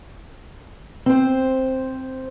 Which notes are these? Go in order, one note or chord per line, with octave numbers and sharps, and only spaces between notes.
C4 C5